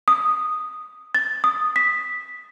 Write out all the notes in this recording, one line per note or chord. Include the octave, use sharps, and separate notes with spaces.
D#6
A6
D#6
B6